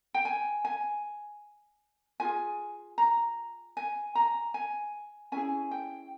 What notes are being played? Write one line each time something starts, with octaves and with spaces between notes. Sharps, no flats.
G5
G#5
G#5
F4 G#4 G#5
A#5
G#5
A#5
G#5
C#4 E4 G#4 G#5
G5